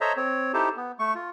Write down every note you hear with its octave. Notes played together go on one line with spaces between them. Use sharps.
A4 C5 C#5 D#5 E5 A#5
C4 C#5
D#4 E4 G4 A4 C5
B3
A3 C#6
F4